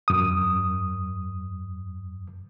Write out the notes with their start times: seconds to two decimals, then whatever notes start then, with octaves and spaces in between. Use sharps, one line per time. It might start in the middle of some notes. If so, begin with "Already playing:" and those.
0.08 F#2 D#6